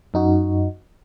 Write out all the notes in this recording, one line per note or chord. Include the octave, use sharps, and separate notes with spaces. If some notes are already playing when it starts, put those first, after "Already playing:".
F#2 D#4 F#4